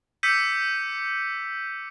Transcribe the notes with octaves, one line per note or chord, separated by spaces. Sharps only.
D6 E6 G6 B6 C#7 D#7